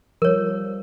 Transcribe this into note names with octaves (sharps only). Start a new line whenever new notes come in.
F3 G3 A#4 C#5